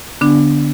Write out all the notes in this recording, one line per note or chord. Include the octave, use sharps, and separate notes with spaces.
D3 B3 D4